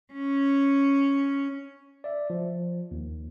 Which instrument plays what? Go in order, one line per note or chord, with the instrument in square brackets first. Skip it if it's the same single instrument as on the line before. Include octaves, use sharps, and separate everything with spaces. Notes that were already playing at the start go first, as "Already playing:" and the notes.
[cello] C#4
[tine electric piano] D5 E5
F3
D#2